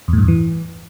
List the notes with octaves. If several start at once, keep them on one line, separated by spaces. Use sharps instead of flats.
E2
A2
G2
E2
E3